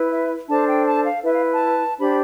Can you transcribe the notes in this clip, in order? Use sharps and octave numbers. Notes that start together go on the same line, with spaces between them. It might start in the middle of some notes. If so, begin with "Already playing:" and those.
Already playing: E4 B4
E5
D4 A4 C5 A5
G5
A5
F5
E4 B4 E5
F5
A5
D4 G4 C5 B5